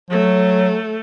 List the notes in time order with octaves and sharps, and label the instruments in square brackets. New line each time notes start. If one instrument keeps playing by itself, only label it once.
[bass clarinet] F#3 [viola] A3